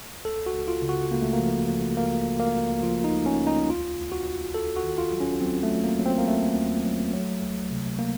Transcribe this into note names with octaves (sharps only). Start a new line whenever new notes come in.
C#2 A4
F#4
C#2
F4
C#3
F#4
C#2 A#3
A3
A#3
F3
F3
C#2 A#3
C#2
A#3
C#2
F3 F4
D#4
C#2
C#4
C#2
D#4
D#2 F4
D#2
F#4
D#2
D#2 A4
F#4
D#3
F4
F#3
C#4
F#3 C4
A3
F#3
A#3
F#3
C4
A#3
D#2 A3
D#2
F#3
F#3
C#2
C3
A#3